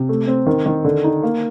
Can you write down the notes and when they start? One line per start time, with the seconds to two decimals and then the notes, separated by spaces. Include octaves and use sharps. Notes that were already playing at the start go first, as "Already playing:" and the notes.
Already playing: C3
0.09 A3
0.28 C4
0.46 D#3
0.66 D#3
0.85 D3
1.04 D#4
1.23 A#3